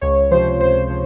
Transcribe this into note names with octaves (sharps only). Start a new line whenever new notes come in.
C#2 C#5
C3 F3 C5
C#2 C5
F3